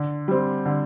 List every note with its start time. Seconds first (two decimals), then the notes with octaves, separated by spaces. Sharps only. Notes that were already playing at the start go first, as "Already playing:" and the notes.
Already playing: D3
0.28 G3 C4
0.66 D3